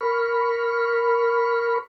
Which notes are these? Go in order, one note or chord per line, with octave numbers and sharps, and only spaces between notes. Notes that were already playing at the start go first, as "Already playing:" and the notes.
A#4 B5 C#6 F6